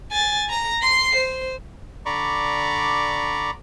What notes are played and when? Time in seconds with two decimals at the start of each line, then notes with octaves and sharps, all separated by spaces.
0.12 G#5 A6
0.49 A#5 A#6
0.82 C6 C7
1.16 C5
2.06 D3 D5 A#5 B5 C#6 D6